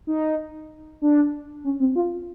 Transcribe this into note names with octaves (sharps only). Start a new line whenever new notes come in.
D#4
D4
C#4
C4
F4